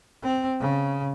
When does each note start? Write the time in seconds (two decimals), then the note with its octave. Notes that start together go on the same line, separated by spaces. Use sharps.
0.23 C4
0.60 C#3